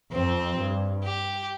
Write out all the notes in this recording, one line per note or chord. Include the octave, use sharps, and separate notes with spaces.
F2 C4
G2
G4